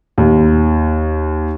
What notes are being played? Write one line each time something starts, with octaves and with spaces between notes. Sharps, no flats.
D#2